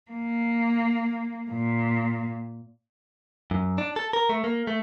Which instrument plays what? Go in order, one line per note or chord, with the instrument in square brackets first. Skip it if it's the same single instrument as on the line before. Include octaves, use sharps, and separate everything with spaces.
[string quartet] A#3
A#2
[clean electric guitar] F#2
D4
A4
A#4
A3
A#3
A3